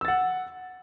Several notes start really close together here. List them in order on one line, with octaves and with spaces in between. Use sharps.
E6 A6 F#5